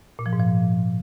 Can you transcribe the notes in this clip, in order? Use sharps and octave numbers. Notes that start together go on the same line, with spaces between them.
A#2
F3
G#2
F3